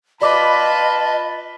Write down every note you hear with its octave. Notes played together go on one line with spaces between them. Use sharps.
F4 B4 D5 D#5 A5 B5 D6